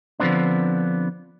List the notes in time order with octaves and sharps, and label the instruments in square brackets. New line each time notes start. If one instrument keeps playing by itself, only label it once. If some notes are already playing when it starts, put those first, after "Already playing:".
[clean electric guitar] D3 F3 G#3 B3 C4 D4